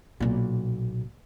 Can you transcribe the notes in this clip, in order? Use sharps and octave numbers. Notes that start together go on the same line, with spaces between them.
B1 A#2